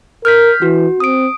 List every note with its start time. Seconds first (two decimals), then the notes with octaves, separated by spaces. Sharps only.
0.25 A#4 F6 G6 B6
0.62 E3 F#4
1.00 C4 D#6 D7